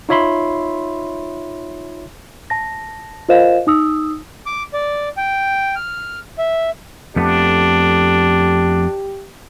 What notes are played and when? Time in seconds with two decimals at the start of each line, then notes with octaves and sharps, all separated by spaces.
0.09 D#4 F4 C#5 E5 B5 C6
2.50 A5 A#6
3.29 F4 A#4 C5 D#5 F5 E7
3.67 D#4 D#6 E6
4.46 D6
4.73 D5
5.17 G5
5.76 F6
6.38 E5
7.16 F2 A3 B3 D4 G4